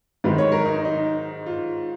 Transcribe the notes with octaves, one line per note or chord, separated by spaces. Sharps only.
G#2 D#3 F#3 B4
C#5
A#4
D#4
D#4
F4